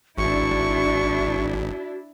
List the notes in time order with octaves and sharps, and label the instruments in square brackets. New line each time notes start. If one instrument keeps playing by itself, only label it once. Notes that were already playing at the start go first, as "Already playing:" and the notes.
[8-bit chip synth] G#1 [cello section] D4 E4 [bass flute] F#4 [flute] C#6